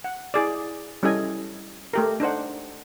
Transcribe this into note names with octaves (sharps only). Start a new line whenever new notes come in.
F#5
E4 G#4 D5
G3 C#4 E4 A4 D#5 G#5
A3 G4 A#4
D4 D#4 C5 F#5